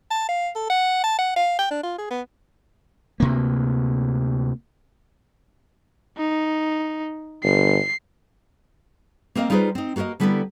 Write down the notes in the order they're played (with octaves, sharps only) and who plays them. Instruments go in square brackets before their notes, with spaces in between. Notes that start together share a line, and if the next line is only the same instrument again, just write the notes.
[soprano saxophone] A5
F5
A4
F#5
A5
F#5
F5
G5
D4
F4
G#4
B3
[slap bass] D2 C3 A#3
[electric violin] D#4
[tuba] G1 [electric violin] C7
[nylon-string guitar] A#3 C4 A#4 D#5 F5
G3 D#4 F4 G#4 B4 C5
C4 D#4
A#3 F#4 G#4 A#4 D#5
D3 G3 B3 E4 A4 A#4